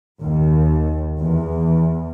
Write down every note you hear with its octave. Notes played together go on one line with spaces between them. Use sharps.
D#2
E2